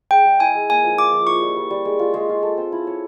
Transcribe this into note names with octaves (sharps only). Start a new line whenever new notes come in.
G#3 G5
G#3
E4 G#5
G#3
A#3 G#5
F3
F4 D6
F3
E4 C#6
G3
G3
G3
G#3
F4
G#3
F4
A4
C4
E4
C#5